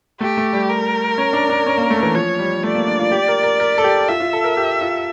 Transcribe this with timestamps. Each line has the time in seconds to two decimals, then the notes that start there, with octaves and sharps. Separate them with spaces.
0.20 A3 G4
0.37 A3
0.53 G3
0.69 A#4
1.18 C#4
1.33 D4
1.49 D4
1.66 C#4
1.78 A#3
1.90 A3
2.03 E3
2.14 F3 C#5
2.39 G3
2.63 A3 D5
2.75 A#3
2.87 D4
2.99 F4
3.12 G4
3.28 A#4
3.43 A#4
3.60 A#4
3.78 A4
3.84 G4
4.08 F4 E5
4.20 F4
4.33 A4
4.44 A#4
4.57 G4
4.81 F4